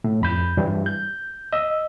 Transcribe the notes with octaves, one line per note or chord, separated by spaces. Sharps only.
A2
F2 B5 G6
G2 E3 G3
G6
D#5 E6